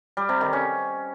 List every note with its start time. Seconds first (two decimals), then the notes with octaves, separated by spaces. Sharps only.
0.17 G3
0.29 C3
0.41 D#3
0.53 C#4